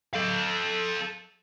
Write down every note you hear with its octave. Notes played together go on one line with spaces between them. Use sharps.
A4 F5